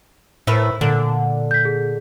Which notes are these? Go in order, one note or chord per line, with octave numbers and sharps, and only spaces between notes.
A2 E4 A#4 B4
A#2 D3
G6 B6
G#4